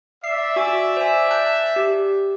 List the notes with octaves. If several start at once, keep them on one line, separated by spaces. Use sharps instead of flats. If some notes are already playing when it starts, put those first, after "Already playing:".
D5 E5 C7
F#4 G#5 D6
C5 G#5
A5 F#6 G6
G4